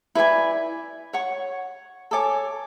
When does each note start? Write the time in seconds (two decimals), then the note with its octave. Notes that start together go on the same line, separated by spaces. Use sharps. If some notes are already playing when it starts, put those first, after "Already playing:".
0.15 E4 B4 D5 G#5
1.13 C#5 F#5 C#6
2.11 A4 C#5 G#5 D6